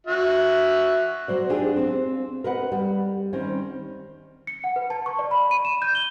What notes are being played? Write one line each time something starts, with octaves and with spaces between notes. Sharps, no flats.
F#4 E5
F#3 C5 D5
D4 D#4 F4 G4 G#4
C4
A#4 B4 D#5 F#5
G3
D#3 G3 C4 C#4
C#7
F#5
B4
A5
C#6
D5
B5
D#7
E7
G6
G7